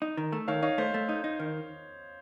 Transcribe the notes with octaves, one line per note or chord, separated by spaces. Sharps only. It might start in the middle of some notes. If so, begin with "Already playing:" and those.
D#4
D#3
A3
D#3 C#5 F5
D#4 C#5 F5
A3 C5 D#5
A3
D#4
D#4
D#3